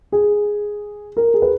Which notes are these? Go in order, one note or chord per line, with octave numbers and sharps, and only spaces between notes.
G#4
A#4
G#4
B4